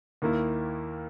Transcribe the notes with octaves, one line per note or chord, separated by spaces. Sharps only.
D#2 D#3 A#3 E4